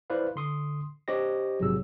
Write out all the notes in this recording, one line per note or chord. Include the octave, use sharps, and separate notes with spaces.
E4 B4 C5 D5 F5
D3 C6 D#6
D4 G4 C5 C#5 D#5 A#6
A#1 G#2 C3 F#3 G#4 E6